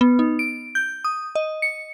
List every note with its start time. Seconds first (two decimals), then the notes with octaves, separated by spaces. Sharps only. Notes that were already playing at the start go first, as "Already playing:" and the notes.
0.01 B3
0.19 D#4
0.39 D7
0.75 G6
1.04 D#6
1.35 D#5
1.62 C#7